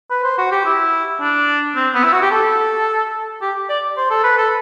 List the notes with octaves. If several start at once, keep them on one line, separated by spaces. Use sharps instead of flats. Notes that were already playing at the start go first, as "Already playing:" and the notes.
B4
C5
F#4
G4
E4
D4
C4
B3
E4
F#4
G4
A4
G4
D5
C5
A4
B4
A4